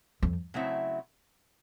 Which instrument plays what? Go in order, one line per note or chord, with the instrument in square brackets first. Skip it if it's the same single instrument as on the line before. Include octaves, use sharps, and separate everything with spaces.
[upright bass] F2
[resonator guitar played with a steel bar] C#3 F#3 A3 C4 E4